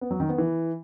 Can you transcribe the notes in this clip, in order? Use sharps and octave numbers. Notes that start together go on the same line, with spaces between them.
B3
F#3
D#3
B3
E3